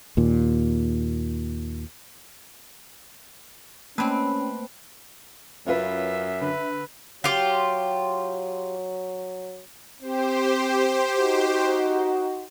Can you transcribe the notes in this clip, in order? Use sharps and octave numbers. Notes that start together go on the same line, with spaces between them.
D#2 A#2
A3 A#3 C4 C#4 B4 A5
F#2 C#4 F4 B4 E5
D3 B4
F#3 F4 G4
C4 G4 C5
D#4 F#4